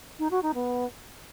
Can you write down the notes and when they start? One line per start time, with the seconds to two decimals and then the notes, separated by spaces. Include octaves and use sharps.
0.19 D#4
0.31 F#4
0.42 D#4
0.54 B3